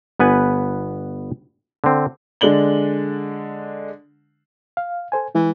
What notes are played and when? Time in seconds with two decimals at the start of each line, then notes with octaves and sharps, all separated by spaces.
0.19 G1 B3 B4 G#5
1.84 D3 C4
2.41 D3 G#3 D4 F#7 G7
4.77 F5
5.12 A4 C5 G#5
5.35 E3 G#3